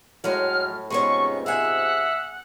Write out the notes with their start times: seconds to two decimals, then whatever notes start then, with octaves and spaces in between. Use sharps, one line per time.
0.24 A2 F#3 G#3 F6
0.90 F2 G#2 C3 G#3 B3 C#4 C#6
1.46 G#4 E5 F#5 G#5